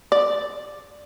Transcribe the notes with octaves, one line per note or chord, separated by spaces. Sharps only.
D5